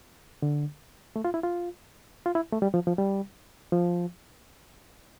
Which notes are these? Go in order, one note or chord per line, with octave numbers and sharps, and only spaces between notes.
D3
A3
F4
E4
F4
F4
E4
A3
G3
F3
F3
G3
F3